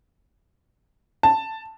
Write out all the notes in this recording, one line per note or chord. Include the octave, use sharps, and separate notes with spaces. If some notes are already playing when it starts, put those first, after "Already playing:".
A5